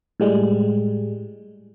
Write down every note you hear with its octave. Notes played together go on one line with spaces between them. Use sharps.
A2 G3 G#3